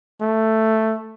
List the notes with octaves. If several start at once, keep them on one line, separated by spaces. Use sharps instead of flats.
A3